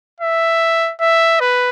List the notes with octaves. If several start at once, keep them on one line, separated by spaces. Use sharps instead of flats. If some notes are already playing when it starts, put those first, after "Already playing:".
E5
E5
B4